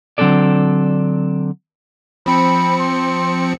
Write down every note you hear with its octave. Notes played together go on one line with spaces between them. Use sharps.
D3 F#3 C4 D4 A4 D5
F3 C4 B5 C#7
C6